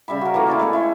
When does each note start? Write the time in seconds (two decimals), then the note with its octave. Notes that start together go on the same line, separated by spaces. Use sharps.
0.08 C#3 G3 E5 B5
0.21 F#4 A#4
0.34 E3 A3 A#3 F4
0.47 E4 F4 A4 D5
0.59 G#3 C4 C#5
0.73 E4 C5